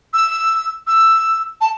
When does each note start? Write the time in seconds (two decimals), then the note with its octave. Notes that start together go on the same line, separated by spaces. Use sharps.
0.13 E6
0.87 E6
1.60 A5